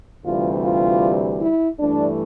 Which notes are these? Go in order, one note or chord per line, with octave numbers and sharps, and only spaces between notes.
D2 C3 E3 G3 F4
F4
E4
G2 E3 A3 D4